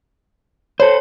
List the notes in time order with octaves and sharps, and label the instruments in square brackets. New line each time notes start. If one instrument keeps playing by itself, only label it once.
[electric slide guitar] A4 C5 [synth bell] C#5